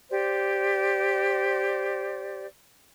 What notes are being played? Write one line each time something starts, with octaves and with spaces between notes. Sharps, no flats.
G4 C5 D5